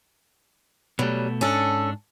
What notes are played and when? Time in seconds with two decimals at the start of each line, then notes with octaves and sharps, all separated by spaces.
0.99 B2 F#3 G3 A3
1.41 G#2 C#4 D4 A4